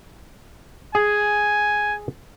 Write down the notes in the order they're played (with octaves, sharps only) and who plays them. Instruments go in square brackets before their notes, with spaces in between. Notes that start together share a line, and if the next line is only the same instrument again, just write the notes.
[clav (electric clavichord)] G#4 [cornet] G#5